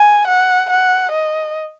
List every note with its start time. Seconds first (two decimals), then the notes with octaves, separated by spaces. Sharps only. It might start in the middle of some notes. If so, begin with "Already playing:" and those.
Already playing: G#5
0.27 F#5
0.70 F#5
1.11 D#5